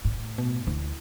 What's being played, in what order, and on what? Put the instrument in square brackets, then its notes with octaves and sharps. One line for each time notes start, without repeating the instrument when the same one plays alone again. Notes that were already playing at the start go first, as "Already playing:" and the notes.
[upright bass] A2
[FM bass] B2
[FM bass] D2 [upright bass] E4